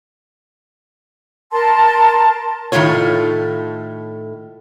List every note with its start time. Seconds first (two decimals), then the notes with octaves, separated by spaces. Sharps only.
1.52 A#4 A5 C6
2.72 A2 D#3 G3 A3 F4 C#5